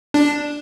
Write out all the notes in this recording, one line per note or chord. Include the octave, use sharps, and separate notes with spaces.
D4